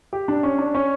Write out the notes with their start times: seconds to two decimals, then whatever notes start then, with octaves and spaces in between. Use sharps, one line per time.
0.13 G4
0.28 D4
0.43 C#4
0.58 D4
0.75 C#4